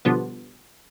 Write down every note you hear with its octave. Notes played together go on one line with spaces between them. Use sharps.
B2 D3 F3 G3 B3